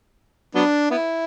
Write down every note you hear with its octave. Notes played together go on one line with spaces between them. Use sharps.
F#3 B3 D4
B3 E4